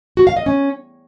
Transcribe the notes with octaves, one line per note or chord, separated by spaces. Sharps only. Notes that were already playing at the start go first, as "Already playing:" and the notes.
F#4
F5
D#5
C#4